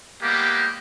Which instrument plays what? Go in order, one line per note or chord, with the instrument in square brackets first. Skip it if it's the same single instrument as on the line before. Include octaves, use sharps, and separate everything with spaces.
[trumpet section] G3 G#3 A#3 B3 G4